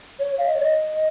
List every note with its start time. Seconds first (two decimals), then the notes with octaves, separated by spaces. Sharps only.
0.20 C#5
0.38 F5
0.47 D#5
0.55 C#5
0.62 D#5